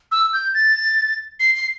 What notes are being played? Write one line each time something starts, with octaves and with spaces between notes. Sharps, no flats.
E6
G6
A6
C7
C7